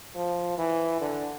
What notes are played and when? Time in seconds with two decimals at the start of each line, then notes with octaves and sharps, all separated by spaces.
0.15 F3
0.58 E3
1.01 D3